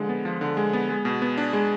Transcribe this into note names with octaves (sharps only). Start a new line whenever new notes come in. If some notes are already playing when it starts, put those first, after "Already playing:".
Already playing: D3 F3 G#3
B3
F3
D3
G#3
B3
G#3
B2
B3
D4
G#3